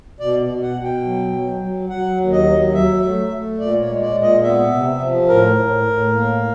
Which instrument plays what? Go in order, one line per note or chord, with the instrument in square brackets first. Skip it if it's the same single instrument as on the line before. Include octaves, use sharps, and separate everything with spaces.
[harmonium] B2 D5
B2
F#5
B2
G5
F#3
F#3
F#3
F#3 F#5
D#2
D#5
F#3
F#3 E5
A3
A3
A#2 D5
C#5
G#3
D5
A#2
D#5
B3 E5
C3
F3
A2 A#4
A2
A2
A#3